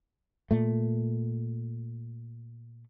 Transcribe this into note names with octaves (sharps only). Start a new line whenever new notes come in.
A#2 A3